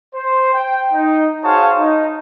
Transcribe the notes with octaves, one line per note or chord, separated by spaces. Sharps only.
C5
G5
D#4
F#4 G#4 C5 C#5 F5 A5
D#4